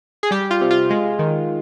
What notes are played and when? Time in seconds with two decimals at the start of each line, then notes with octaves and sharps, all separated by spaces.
0.23 G#4
0.31 G3 G4
0.51 F4
0.61 C3
0.71 F4
0.90 G#3
1.19 D#3